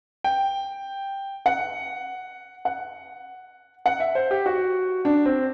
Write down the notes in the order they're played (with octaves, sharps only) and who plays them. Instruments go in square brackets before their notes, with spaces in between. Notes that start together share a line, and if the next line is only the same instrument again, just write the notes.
[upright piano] G5
F#5
F#5
F#5
E5
C5
G4
F#4
D4
C4